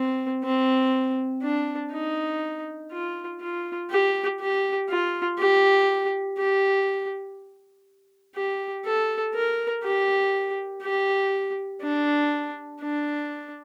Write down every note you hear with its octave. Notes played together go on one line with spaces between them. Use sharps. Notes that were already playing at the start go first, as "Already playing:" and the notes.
Already playing: C4
C4
D4
D#4
F4
F4
G4
G4
F4
G4
G4
G4
A4
A#4
G4
G4
D4
D4